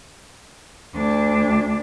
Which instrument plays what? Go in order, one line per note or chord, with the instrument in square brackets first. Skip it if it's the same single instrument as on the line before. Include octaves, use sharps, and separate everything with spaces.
[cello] D2 D4